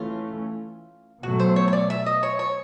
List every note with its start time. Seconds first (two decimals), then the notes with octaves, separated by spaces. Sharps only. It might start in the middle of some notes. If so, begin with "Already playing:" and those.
Already playing: E3 A3 C#4 F4
1.23 B2 F#3 A3 F#4
1.39 C5
1.56 C#5
1.68 C#5
1.73 D5
1.90 E5
2.06 D#5
2.23 C#5
2.39 C#5